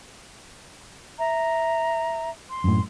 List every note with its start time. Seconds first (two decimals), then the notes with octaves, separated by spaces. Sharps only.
1.19 E5 A#5
2.50 C6
2.64 F#2 A2